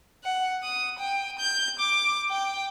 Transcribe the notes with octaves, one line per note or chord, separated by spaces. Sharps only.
F#5
D#6
G5
G6
D6
G5